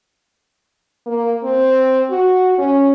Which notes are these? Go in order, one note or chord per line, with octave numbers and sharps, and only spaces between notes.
A#3
C4
F#4
C#4